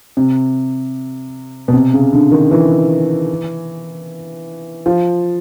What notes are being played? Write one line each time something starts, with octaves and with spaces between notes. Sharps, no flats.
C3
B2
C3
C#3
D3
D#3
E3
F3